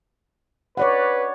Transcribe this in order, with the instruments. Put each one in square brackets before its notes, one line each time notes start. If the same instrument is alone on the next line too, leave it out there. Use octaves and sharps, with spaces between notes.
[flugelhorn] B4 [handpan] C#5 D5 F#5